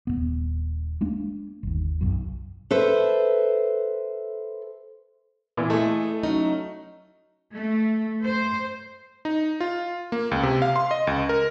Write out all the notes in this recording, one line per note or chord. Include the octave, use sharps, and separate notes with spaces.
D#1 F#2 B3
G#3 A#3 D4
G1 D#2
B1 F#2
A4 B4 C5 E5
A#2 E3 C4 E4
A3 E4 G#4 A4 D#5 G#5
F#3 C#4 D#4
A3
C5
D#4
F4
A#3
C#2
C3
F5
C6
D#5
C#2
A#4